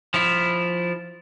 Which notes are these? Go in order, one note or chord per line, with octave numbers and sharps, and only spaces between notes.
F3 E4